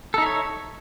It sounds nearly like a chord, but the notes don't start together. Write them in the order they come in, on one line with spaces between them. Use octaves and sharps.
A4 D#4 E5 C#5